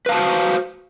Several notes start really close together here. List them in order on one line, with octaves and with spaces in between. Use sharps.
B4 F5 A5 F#4 C5